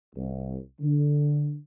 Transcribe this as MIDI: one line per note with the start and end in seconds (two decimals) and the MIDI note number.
0.16 0.57 36
0.81 1.56 50